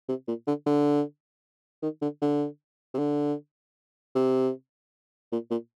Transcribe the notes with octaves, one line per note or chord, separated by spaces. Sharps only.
C3
A#2
D3
D3
D#3
D3
D3
C3
D3
C3
A#2
A#2